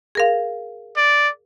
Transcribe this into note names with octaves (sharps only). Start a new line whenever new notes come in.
G#4 A#4 F5
D5